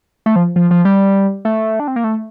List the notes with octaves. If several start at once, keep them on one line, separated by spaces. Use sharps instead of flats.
A3
F3
F3
F3
G3
A3
D4
C4
A#3
A3